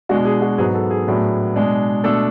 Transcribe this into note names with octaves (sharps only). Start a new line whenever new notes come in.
B2 G#3 D4 F#4
G#4
F#4
G#2 F#3 B3 G#4
A4
G#4
A2 F#3 B3 D4
B2 G#3 D4
B2 A3 D4 A4